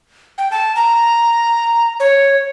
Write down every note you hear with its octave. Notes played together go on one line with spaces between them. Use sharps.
G5
A5
A#5
C#5